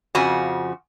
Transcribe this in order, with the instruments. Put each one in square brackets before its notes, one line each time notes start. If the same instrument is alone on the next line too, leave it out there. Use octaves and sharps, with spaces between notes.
[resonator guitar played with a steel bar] F2 C#3 F3 F#4 G#5